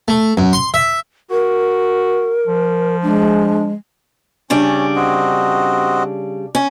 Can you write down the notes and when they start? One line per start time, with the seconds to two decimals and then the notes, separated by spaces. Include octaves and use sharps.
0.08 A3
0.37 F#2
0.53 C6
0.74 E5
1.31 F#4 A#4
2.47 F3
3.03 G#3 D4
4.50 C#3 G3 C#4 D4
4.96 C4 F#4 D#5
6.55 C#4